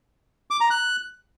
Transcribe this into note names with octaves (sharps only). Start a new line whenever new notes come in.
D6
A#5
F#6